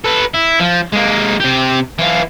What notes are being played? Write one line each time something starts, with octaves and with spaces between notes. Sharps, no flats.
A4 B4
E4
F3
G#3 A#3
C3 G4
E3 F4